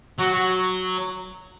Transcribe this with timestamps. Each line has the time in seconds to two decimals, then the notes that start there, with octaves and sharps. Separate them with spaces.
0.19 F#3 F#4
0.34 F#4